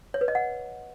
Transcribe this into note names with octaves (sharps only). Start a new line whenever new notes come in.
C#5
B4
D#5
F#5